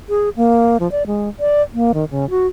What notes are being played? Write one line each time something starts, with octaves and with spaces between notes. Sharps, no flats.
G#4
A#3
F3
D5
G#3
D5
A#3
D#3
C#3
F#4